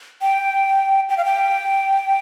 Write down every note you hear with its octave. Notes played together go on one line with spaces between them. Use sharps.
G5
G5
F5
G5